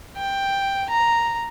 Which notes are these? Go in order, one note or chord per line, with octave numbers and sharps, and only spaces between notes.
G5
A#5